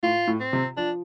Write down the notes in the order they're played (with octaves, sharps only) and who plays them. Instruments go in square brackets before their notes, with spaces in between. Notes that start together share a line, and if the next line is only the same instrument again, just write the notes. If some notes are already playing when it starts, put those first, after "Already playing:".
[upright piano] A2 [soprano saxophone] F4
[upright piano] A2
[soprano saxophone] C4
[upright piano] C3
[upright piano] F3 [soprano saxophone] D4